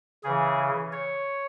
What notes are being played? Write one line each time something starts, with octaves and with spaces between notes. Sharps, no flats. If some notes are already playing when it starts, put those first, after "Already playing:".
C#3 E3 G#4
C#5